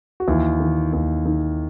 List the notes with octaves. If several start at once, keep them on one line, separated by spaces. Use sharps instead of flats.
F#4
D#2 E3 E4
D#3
D#2
D#3